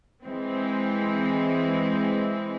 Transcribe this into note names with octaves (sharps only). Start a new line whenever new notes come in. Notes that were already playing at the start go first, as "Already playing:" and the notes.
E3 G#3 C4